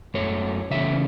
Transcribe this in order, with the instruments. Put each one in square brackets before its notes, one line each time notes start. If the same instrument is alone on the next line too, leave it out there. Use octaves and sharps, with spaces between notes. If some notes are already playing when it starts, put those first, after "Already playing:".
[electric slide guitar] F#2 F#3 A3 C#5
C#3 E3 A3 C#4 E5